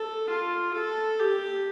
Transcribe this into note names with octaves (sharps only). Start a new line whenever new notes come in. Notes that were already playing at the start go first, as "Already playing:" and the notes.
Already playing: A4
F4
A4
G4